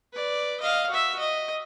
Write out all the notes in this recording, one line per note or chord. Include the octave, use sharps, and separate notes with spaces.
B4 D5
D#5 F5
F#4 E5
D#5